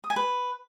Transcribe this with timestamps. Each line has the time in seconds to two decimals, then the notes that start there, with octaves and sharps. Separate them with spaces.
0.04 D#6
0.10 G#5
0.16 B4